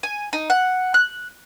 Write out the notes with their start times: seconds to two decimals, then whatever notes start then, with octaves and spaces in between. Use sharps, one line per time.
0.03 G#5
0.33 D#4
0.50 F#5
0.94 F#6